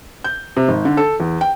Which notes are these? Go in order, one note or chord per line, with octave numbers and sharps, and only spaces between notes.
G6
C3
G#1
D3
A4
E2
G5